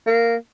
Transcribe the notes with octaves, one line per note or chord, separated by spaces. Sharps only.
A#3